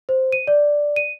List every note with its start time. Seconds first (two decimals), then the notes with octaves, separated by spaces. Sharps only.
0.09 C5
0.32 D#7
0.47 D5
0.96 D#7